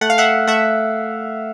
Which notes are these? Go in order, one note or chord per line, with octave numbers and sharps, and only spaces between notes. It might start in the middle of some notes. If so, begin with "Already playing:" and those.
A3 F#5
F5
E5 F#5
A3 E5 F#5